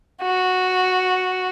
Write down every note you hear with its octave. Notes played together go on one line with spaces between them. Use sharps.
F#4